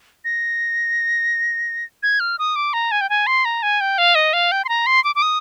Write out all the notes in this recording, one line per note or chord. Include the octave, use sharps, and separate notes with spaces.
A#6
G#6
F6
D#6
D6
A#5
G#5
G5
G#5
C6
A#5
G#5
G5
F5
D#5
F5
G5
C6
A#5
C6
D6
D6
D#6